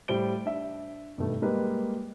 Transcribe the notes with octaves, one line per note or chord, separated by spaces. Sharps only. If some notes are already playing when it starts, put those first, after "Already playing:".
A2 G3 C5 D7 G7
D4 E5
G2 B2 D#3 A3
G3 G#3 A#3 B4